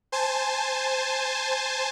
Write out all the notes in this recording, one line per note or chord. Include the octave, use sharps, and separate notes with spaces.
C5 G#5 A5